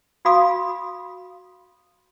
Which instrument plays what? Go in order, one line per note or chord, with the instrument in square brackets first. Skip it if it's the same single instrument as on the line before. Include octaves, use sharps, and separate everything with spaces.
[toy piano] F#4 F5 B5 D#6